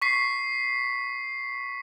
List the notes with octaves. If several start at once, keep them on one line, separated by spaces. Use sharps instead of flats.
C#6 B6 C7